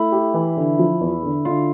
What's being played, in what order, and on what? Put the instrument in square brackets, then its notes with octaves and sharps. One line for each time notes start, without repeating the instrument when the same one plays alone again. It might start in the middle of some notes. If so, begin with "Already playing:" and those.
Already playing: [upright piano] A3 [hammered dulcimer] E4
[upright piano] G4
E3
D3
F3
E2
D3
[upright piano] D3 [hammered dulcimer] F4